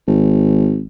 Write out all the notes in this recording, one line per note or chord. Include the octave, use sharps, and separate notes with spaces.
G#1